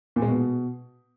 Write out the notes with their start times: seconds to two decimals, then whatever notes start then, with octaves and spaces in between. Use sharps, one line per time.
0.16 A#2
0.22 G#3
0.28 B2